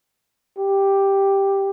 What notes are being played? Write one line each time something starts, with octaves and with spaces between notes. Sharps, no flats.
G4